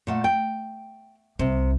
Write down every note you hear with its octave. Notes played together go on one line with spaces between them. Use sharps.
A#2 A3 F#5
G5
C2 C3